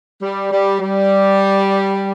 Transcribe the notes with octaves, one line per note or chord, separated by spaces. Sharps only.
G3
G3
G3